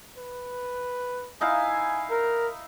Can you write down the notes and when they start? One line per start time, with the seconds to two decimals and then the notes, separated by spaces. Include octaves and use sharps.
0.18 B4
1.41 D#4 E4 F5 G#5
2.10 A#4